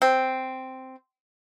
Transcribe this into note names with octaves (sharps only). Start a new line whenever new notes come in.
C4